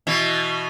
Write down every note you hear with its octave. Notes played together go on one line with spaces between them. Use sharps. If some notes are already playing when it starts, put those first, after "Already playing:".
B2 E3